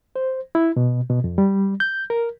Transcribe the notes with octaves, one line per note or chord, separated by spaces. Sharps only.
C5
E4
B2
B2
F2
G3
G6
A#4